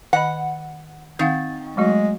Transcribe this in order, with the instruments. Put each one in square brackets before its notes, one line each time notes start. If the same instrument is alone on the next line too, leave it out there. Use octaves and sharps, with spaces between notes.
[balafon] D#3 D#5 B5 [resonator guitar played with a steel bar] F#5
[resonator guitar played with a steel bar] D#3 [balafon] C4 F5 F#5
[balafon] F#3 A3 F#4 [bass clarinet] G#3